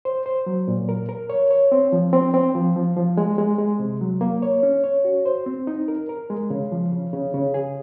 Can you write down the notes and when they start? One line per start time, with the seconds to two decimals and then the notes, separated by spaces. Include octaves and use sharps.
0.05 C5
0.26 C5
0.46 F#3
0.68 A#2
0.89 A#4
1.09 A#4
1.30 C#5
1.51 C#5
1.72 C4
1.93 F3
2.13 C4
2.34 C4
2.55 F3
2.76 F3
2.97 F3
3.17 G#3
3.38 G#3
3.58 G#3
3.79 C3
4.01 F#3
4.21 A#3
4.42 C#5
4.63 C#4
4.84 C#5
5.05 F#4
5.26 C5
5.46 C4
5.67 D#4
5.88 A#4
6.09 A#4
6.30 G#3
6.50 C#3
6.72 F3
6.92 C#3
7.13 C#3
7.34 C#3
7.54 G#4